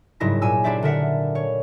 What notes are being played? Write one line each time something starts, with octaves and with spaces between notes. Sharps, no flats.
F#1 G#2 F#3 G3 E4 A#6
A#2 G#5 E6
D4 E4 G4 C5 D5 E5
D3 A#4 E5 F#5
C#5